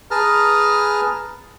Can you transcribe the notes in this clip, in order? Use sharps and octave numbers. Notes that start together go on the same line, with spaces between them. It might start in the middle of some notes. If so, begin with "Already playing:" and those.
G#4 B4 A5 A#5 F6